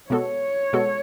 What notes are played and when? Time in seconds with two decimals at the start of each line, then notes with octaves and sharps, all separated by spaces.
0.10 B2 G#3 B3 F#4 A4 C#5
0.73 B2 G#3 B3 F#4 A4